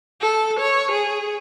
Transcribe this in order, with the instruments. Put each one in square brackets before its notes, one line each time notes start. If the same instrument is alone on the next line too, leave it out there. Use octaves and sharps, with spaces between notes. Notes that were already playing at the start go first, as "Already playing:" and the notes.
[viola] A4
C#5
G#4